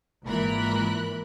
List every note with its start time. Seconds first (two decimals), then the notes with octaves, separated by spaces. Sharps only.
0.24 G#1 A#2 E3 A#4 B5 F#6